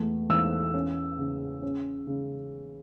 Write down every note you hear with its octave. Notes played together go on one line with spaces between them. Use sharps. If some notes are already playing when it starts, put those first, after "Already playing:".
Already playing: E2 A3
E2 E6
C#4
C#3
C#4
C#3